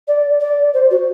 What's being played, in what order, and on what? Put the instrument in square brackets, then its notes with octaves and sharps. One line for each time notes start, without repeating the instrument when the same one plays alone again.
[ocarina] D5
D5
C5
F#4